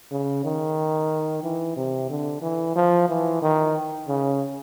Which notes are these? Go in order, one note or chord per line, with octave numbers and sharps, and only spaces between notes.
C#3
D#3
E3
C3
D3
E3
F3
E3
D#3
C#3